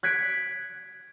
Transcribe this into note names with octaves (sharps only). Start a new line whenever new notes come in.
F#6 G#6 B6 C#7 D7